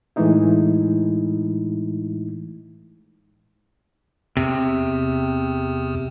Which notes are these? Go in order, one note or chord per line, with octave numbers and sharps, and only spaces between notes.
A2 E3 G#3 A3 D#4 E4
E2 C3